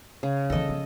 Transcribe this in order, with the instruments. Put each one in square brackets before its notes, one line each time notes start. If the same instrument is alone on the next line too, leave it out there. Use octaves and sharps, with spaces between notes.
[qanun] C#3
[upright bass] D3 E3 [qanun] A4 D#5
[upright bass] F3